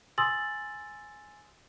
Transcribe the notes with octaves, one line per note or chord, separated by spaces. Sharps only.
G#5 C6 D#6 E6 A6 F#7